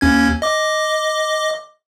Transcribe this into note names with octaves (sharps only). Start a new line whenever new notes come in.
D#2 C#4 G#6
D#5 D6